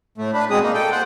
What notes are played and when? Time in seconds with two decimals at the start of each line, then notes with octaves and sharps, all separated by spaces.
0.18 A2 A3
0.34 D4 B4
0.50 B2 G#3 C4 G#4 D#6
0.62 A#3 D#4
0.74 A4 G5
0.92 C5 F#5